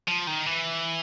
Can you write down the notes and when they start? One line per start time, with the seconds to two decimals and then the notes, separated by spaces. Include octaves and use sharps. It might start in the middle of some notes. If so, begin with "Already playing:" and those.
0.08 F3
0.27 D#3
0.46 E3